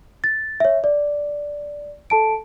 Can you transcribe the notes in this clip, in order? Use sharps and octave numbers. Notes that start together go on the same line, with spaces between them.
A6
C#5 E5
D5
A4 A5 D7